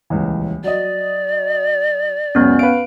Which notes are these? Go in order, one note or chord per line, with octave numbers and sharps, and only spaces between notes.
D#1 C#2 E3
F#3 D5 D#5
C#2 F#2 B3 C#4
B4 F5 D7